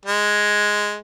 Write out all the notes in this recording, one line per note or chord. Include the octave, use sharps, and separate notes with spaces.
G#3